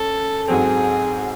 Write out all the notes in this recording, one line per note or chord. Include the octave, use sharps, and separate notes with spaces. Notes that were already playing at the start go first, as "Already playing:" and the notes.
Already playing: C#4 A4
G#2 F#3 C4 G#4